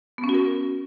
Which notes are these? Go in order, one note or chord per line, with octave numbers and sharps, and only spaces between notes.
B3
C#4
F#4
A#4